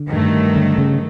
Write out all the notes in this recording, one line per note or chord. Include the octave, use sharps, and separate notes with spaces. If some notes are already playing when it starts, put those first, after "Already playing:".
Already playing: D3
G2 D#3 F#3 A3
D3
C#3